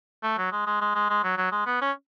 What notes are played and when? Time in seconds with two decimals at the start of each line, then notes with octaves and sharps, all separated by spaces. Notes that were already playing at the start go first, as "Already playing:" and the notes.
0.23 A3
0.38 F#3
0.52 G#3
0.67 G#3
0.81 G#3
0.95 G#3
1.10 G#3
1.24 F#3
1.38 F#3
1.52 G#3
1.66 B3
1.81 C#4